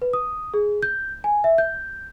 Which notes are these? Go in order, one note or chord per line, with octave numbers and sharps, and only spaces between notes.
B4
D#6
G#4
G6
G#5
E5
G6